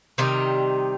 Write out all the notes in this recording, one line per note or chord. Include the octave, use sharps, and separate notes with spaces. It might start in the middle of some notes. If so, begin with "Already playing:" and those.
C3 D#3 G3 D#4